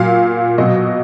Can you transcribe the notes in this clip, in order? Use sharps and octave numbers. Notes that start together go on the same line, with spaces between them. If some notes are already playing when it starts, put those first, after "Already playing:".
Already playing: A#2 F#3 F5
B2 F#3 D#5